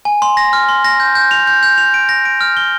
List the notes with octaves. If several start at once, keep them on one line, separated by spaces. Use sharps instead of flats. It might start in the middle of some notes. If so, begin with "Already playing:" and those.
G#5
C6
A#6
F6
C6
A#6
G6
G6
F7
G6
G6
F7
D7
A#6
D7
F6
G7